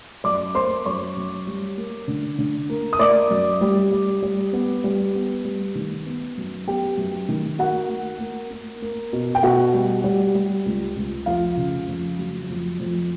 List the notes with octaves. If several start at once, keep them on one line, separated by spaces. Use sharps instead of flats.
F#2 D5 D6
A#3 C5 C6
F#2 C#5 C#6
F#2
G3
A#3
D3
D3
A#3
D#6
A#3 D5 D6
F#2
G3
G3
G3
B3
G3
B3
G3
D#3
B3
F#2
B3 G4 G5
F#2
D#3
A#3 F#4 F#5
A#3
A#3
A#3
A#3
B2
G5
B2 F#4 F#5
G3
G3
G3
C#2
C#2
F2 F4 F5
C#3
F2
F#3
F2
F2